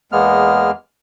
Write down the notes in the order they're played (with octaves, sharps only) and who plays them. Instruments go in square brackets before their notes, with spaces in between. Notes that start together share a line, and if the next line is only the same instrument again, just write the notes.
[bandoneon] E2 G#3 A#3 B3 F6